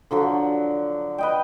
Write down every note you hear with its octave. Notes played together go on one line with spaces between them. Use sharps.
D3 F3 F#3
B4 D#5 G5